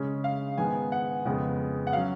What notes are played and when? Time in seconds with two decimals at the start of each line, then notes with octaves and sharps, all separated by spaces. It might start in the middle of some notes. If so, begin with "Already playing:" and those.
Already playing: C#3 G#3 C#4
0.24 F5
0.58 G#2 D#3 G#3 B3 G#5
0.92 F#5
1.25 F2 C#3 G#3 B3
1.87 F#5
1.93 F#3 C#4 F5